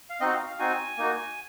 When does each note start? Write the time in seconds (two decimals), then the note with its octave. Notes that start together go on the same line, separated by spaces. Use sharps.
0.10 F5
0.20 C4 D#4 F#4 D#5
0.33 F5
0.46 F5
0.59 C4 D#4 F#4 G#5
0.97 A#3 D#4 F#4